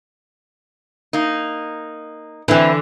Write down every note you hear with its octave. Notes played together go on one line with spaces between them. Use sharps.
A#3 D#4
D3 E3 C4 E4 B4